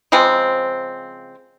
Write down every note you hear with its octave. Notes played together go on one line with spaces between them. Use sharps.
C#3 F3 G#3 C4